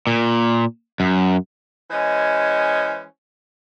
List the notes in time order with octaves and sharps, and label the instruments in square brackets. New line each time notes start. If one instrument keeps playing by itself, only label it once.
[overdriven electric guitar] A#2
F#2
[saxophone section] E3 G#3 C#4 C5 D#5